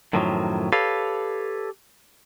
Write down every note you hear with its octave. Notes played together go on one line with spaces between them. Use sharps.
F#2 A2 D#3 F3 F#3
G4 A4 B4 C#5 F5